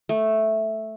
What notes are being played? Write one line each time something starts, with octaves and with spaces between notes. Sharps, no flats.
A3